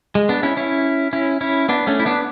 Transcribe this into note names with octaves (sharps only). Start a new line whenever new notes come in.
G#3
B3 D4
C#4 E4
C#4 E4
C#4 E4
C#4 E4
B3 D4
A3 C#4
E4
B3 D4